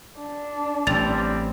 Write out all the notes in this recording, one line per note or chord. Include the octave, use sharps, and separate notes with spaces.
D4
A1 G3 C4 A6 F7